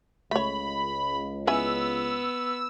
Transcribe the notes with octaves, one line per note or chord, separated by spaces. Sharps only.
C#2 A3 C#5 B5
B3 C#4 E4 G#5 E6